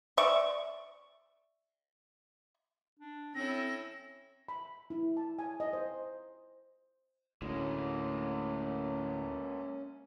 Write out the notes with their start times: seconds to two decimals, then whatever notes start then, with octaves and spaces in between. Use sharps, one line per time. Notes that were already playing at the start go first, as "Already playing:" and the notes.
0.17 D5 E5 C#6
2.99 D4
3.35 C4 C#4 E4 A4 A#6
4.48 B5
4.90 E4
5.17 A5
5.39 G#5
5.60 D#5
5.73 C5
7.42 D2 A2 G#3 A#3 C#4